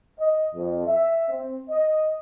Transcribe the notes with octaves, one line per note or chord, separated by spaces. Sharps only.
D#5
F2
E5
C4
D#5